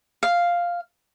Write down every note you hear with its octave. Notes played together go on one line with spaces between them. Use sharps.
F5